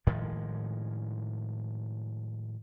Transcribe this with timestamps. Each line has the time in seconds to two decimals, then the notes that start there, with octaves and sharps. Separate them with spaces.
0.07 A2 D#3 F3 G#3